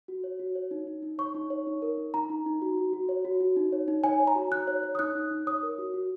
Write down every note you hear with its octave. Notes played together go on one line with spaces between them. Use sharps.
F#4
C#5
F#4
C#5
D#4
D#4
D#4
C#5 C#6
D#4
C#5
D#4
A#4
D#4
D#4 A#5
D#4
D#4
F#4
F#4
F#4
C#5
F#4
F#4
D#4
C#5
D#4
C#5 G#5
C#5
A#5
F#4
D#4 F#6
C#5
C#5
D#6
D#4 F#6
D#4
D#4
C#5 D#6
A#4
F#4
F#4